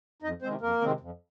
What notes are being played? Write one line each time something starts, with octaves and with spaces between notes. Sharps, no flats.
F2 D#4 D#5
C3 D#3 G#3 C4 C5
F2 A#3 A#4
C3 D#3 G#3 C4
F2